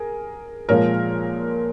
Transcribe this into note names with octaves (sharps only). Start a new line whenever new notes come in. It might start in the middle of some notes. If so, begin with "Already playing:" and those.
Already playing: G#4 A#4
A#2 F3 G#3 A#4 C#5